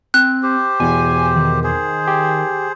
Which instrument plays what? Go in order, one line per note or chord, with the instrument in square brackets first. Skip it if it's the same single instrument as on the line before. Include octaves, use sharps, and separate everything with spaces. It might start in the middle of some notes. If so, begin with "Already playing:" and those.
[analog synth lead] C4 [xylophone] F#6
[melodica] G4 C5
[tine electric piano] E2 B2 [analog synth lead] G#5
[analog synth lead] D#3
[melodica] G#4 C5
[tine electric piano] G4